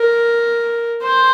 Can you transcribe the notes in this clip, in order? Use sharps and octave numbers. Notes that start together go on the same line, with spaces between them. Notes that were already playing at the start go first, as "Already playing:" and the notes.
Already playing: A#4
C5